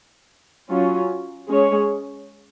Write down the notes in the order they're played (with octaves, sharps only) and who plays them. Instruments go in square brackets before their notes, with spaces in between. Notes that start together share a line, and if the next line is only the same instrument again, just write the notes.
[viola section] F#3 C#4 F4
G#3 C#4 G#4 C#5